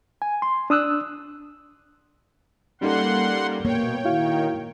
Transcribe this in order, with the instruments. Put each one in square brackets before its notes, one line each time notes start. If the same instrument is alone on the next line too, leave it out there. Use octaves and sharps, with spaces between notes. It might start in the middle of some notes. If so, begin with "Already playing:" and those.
[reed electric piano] G#5
C6
D4 D#6 E6 F#6
[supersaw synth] G3 A#3 [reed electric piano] C#4 D#4 A4 [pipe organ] F#5 C6
[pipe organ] B2 [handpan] A#3 [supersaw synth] C#5 G5
[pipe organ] D#3 [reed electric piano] E4 F#4 F5